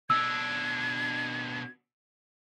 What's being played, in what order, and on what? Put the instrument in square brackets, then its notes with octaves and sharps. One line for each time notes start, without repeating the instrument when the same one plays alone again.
[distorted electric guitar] B2 D4 [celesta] E6 [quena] G#6